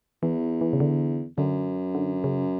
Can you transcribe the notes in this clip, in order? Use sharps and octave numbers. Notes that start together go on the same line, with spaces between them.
E2 E3
E3
C#3
D3
F#2 D3
D3
C#3